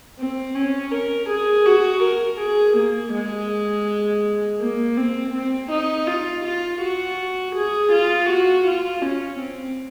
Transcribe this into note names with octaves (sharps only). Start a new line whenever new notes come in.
C4
C#4
A#4
G#4
F#4
A#4
G#4
A#3
G#3
A#3
C4
C4
D#4
F4
F4
F#4
G#4
F4
F#4
F4
C#4
C4